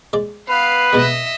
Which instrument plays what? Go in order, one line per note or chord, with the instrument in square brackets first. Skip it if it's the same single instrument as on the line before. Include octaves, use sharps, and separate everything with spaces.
[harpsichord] G#3 D5
[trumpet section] B3 B4 [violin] F5 C7
[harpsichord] B2 G#3 [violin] D#5 E5